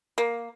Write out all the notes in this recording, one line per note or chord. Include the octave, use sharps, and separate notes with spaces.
A#3